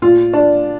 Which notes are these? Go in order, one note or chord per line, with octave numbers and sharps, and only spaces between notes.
A#2 F4
D4